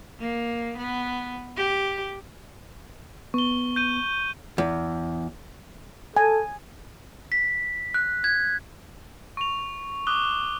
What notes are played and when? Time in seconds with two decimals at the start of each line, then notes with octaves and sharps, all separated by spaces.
0.20 A#3
0.77 B3
1.56 G4
3.34 B3 C#6 G7
3.76 G6 D#7
4.58 E2
6.17 A4 G#5
7.32 B6
7.94 F#6
8.24 G#6
9.37 C#6 F7
10.07 D6 D#6 F#6 G7